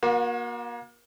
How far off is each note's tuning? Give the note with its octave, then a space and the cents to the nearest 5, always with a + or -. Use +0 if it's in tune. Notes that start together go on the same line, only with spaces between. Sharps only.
A#3 +35 F#4 -30